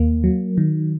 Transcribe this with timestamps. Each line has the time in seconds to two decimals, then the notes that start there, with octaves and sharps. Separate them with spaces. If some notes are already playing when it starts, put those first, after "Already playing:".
Already playing: D#2 A#3
0.24 F#3
0.58 D#3